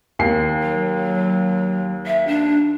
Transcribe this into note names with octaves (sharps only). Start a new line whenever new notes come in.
D#2 C7
F#3
E5
D4